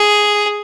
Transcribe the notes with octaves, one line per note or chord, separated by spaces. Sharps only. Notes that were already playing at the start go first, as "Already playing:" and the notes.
Already playing: G#4